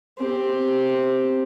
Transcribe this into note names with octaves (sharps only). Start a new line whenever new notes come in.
C4 G4